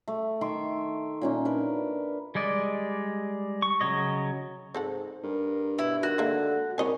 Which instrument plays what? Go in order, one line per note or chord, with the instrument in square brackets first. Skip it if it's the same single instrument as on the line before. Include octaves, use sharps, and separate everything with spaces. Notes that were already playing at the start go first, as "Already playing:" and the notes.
[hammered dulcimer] A3
D#3 E5 C6 D6
A#2 C#4 D#4
D4 A#4 B4
[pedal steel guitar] G3 G#3 D5 D#5
C#6
C#3 F#3 C#5 D#5
[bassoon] G#2 [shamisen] C4 A4 F#5
[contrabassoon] G2 [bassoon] A#4
[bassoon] B2 [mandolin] E4
[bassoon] D#3 [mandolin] F#4
[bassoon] D3 [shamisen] G#3 A#3 E5
[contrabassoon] C2 [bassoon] A#2 [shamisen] C#5 D#5 G#5